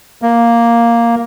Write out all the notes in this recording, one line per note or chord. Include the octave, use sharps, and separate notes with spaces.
A#3